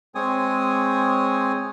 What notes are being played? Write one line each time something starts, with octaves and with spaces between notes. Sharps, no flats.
G#3 C4 C#5 G#5 D#6